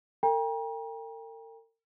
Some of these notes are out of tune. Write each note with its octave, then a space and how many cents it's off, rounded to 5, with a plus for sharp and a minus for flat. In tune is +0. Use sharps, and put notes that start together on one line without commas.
A#4 -45 G5 +30 A#5 +35